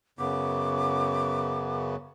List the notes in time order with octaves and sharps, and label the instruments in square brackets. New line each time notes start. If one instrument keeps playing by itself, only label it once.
[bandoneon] F#2 C#3 B3 [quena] D6